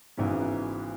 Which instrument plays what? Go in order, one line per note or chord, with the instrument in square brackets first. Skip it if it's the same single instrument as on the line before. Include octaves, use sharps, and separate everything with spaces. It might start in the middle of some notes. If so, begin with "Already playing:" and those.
[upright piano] G#1 G#2 [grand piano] C#3 E3 B3 E4